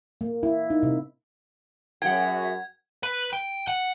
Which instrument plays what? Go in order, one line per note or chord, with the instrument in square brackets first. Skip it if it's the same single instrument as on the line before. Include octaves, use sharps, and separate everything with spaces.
[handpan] A#3
E4
D#4
C3
[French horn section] F#2 [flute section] G#4 E5 [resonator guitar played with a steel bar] F#5 G5 [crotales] G#6
[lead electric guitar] B4
G5
F#5